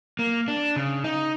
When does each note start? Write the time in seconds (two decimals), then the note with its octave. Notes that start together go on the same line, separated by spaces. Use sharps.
0.19 A#3
0.48 D4
0.76 C#3
1.04 D#4